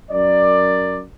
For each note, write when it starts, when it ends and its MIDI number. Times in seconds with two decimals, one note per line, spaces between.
0.11 1.01 42
0.11 1.01 70
0.11 1.01 74